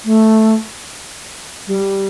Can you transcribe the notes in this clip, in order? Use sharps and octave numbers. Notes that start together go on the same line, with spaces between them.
A3
G3